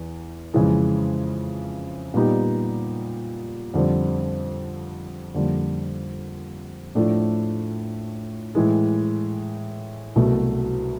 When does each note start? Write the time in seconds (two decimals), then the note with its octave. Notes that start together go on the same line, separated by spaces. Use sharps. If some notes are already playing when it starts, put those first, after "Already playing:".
Already playing: E2
0.54 F2 C#3 E3 G#3
2.14 A#2 G3 B3 D#4 G4
3.74 F2 D3 G3 C4
5.35 F2 D3 G3 A#3
6.95 A2 F3 A3 D4
8.55 A2 E3 G#3
10.16 C2 B2 F#3 A3